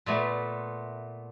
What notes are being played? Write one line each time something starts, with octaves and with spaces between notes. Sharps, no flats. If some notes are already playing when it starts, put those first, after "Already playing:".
A#2 A3 B3